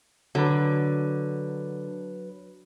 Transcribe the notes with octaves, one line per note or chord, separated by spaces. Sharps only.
D3 F#3 B4